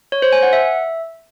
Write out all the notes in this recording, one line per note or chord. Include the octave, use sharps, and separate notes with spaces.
C#5
C5
G#5
F#5
E5